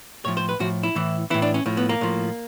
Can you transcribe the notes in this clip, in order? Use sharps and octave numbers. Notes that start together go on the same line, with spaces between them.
A2 F3 C#5
C5
B4
A2 F3 F#4
E4
A2 E3
A2 E3 E4
D4
C#4
A2 F3
B3
A#3
A2 F3